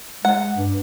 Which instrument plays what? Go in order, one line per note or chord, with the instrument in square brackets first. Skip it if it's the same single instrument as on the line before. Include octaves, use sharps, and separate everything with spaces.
[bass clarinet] G#3 [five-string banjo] F#5
[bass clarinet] G2